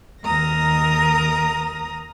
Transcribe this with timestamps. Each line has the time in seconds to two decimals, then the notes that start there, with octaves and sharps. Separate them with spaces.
0.24 D#2 D#3 A#4 A#5 D#6 A#6